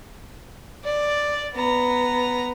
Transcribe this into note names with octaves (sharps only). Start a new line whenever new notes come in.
D5
B3 A#5